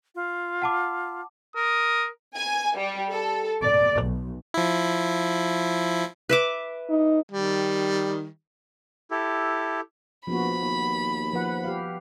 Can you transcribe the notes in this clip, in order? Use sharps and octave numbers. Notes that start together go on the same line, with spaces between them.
F4
F#5 A5 D6
A#4 D#6
G#5
G3
A4
D5
B1
F3 E4
B4 E5 D6
D#4
D#3 G3
E4 G4 A4
A#1 F3 B3 F#4 B5
D#2
F3 B4 F#5
G4 F5